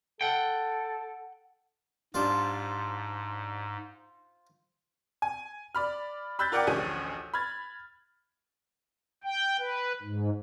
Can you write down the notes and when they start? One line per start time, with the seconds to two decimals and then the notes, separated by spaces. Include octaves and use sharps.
0.21 A4 F#5 G5
2.14 G#2 G3 D4 F4 C5
5.22 G#5
5.75 D5 B5 F6
6.39 B5 E6 F#6 G6 A6 B6
6.52 F4 A#4 D5 F#5 G5 D6
6.67 A1 D2 F3 C#4 G#4 D#7
7.34 B5 F6 G#6 A6
9.24 G5
9.59 B4
10.02 G#2